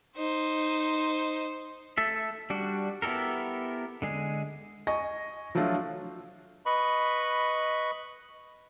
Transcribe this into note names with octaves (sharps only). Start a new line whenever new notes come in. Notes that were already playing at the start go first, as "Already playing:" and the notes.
D#4 C5
A3 A4 E5
G3 D4 F#4
B3 E4 G4 A4 A#4
D3 G#3 G#4
D#5 G#5 C#6 A#6
F3 F#3 A3 D4 F4 A4
B4 D#5 B5 C#6